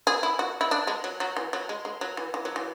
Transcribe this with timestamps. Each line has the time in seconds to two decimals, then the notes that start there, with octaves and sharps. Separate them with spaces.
0.07 G#4
0.23 E4
0.39 F#4
0.61 E4
0.71 D4
0.87 G#3
1.04 F#3
1.20 F#3
1.36 E3
1.53 F#3
1.69 G#3
1.85 G#3
2.01 F#3
2.17 E3
2.34 E3
2.45 F#3
2.56 E3